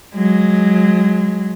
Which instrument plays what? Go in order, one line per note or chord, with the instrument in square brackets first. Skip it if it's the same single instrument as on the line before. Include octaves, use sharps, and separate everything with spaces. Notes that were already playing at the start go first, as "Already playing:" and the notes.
[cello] F#3 G#3